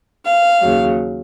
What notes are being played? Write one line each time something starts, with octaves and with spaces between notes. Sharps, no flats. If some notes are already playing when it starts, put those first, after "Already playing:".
F5
D#2 C#3 F#3